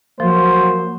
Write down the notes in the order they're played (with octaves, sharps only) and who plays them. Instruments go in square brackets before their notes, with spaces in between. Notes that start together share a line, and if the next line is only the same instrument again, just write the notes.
[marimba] F3 [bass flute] F#3 [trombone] A#3 [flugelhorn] C5